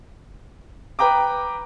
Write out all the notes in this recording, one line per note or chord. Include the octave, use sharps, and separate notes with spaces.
B4 G5 A#5 D6